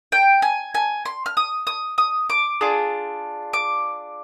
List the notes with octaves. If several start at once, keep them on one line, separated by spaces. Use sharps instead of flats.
G5
G#5
G#5
C6
F6
D#6
D#6
D#6
D6
D4 F4 G#4
D6